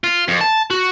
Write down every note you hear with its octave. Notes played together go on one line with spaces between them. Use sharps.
F4
F2
A5
F#4